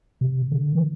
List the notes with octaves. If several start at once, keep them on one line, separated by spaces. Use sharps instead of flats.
C3
D3
E3